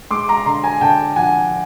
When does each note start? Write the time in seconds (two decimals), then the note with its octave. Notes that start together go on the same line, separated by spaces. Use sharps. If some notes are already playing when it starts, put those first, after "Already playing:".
0.11 G#3 C6 D6
0.28 A#5 C6
0.46 D3 A#5 C6
0.64 G#5 A#5
0.81 D3 G5 A5
1.16 F3 F#5 G#5